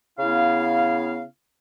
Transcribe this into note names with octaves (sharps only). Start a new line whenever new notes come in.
C#3 B3 E4 F5